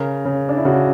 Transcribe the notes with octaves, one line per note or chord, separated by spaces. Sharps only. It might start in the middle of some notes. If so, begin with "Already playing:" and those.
Already playing: C#3 A#4
C#3
D4
E4
C#3 F#4